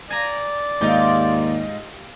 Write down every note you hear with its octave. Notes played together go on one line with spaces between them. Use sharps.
D5 G#5 A#5
D#2 G#2 D#4 F4 G4